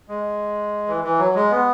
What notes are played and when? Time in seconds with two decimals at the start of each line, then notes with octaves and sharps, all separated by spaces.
0.08 G#3
0.88 E3
1.04 E3
1.18 F#3
1.35 G#3
1.51 B3